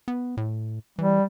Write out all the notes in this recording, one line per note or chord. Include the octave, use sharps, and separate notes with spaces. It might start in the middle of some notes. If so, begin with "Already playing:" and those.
B3
A2
E3 G3